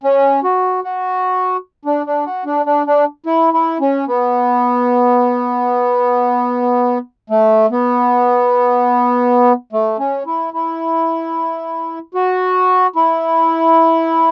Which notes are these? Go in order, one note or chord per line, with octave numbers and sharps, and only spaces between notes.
C#4
F#4
F#4
D4
D4
F#4
D4
D4
D4
E4
E4
C#4
B3
A3
B3
A3
C#4
E4
E4
F#4
E4